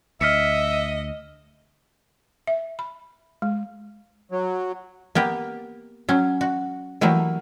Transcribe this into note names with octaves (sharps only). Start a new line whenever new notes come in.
D2 D#5 E5 F6 B6 C#7
E5
B5
G#3
F#3
A#3 B3 G4
F#3 C#4
F#4
E3 F#3 A3 A#3 G4